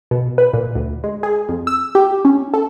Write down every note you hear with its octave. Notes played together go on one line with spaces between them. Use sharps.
B2
B4
A#2
D2
G#3
G#4
F2
E6
G4
C#4
A4